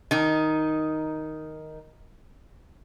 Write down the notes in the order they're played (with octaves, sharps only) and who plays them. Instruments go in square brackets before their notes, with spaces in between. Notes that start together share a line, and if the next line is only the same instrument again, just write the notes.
[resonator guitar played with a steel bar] D#3 D#4